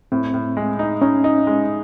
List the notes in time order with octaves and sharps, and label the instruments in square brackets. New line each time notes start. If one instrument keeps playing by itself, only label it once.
[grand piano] A2 [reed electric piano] C4
[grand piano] A2
G#3
D#4
[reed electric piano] C#4 [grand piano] D#4
[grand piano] D#4
G#3